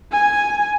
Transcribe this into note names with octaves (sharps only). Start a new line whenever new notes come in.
G#5